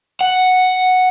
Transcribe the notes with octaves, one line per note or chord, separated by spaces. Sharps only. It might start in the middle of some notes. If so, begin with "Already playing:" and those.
F#5